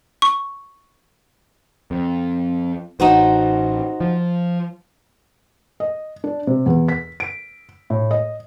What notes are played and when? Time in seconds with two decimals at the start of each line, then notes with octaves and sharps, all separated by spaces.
0.22 C#6
1.91 F2
3.00 A1 D#4 F#4 C5
4.01 F3
5.80 D#5
6.24 D4
6.47 C3
6.66 E2
6.89 B6
7.20 D7
7.90 A2
8.11 D#5